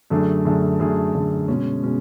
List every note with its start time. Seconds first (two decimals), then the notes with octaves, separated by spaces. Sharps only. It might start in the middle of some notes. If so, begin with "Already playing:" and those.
0.10 F#2 D3 A3 D4 G#4
0.45 F#2 D3 A3 D4 G#4
0.80 F#2 D3 A3 D4 G#4
1.13 F#2 D3 A3 D4 G#4
1.48 B2 G#3 C#4
1.83 B2 G#3 C#4